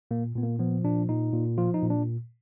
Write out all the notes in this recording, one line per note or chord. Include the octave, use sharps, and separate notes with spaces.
A#2 A#3
A#2 B3
A#3
F3 B3
A#2 D4
A#2 D#4
A#2
F3 F4
D#4
A#2
D4